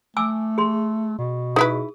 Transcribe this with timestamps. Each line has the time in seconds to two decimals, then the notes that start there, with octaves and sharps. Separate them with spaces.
0.17 A3 G#5 D6 E6
0.58 G#4 C6
1.18 B2
1.56 D#4 E4 G#4 B4 D#6